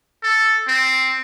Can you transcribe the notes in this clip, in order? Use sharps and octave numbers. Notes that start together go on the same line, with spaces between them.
A4
C4